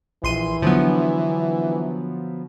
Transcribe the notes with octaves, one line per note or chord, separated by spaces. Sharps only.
A#1 E3 C6 D#7
D3 F3 F#3 B3